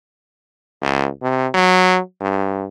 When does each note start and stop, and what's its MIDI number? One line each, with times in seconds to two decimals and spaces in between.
0.82 1.08 37
1.22 1.47 48
1.54 1.99 54
2.21 2.66 43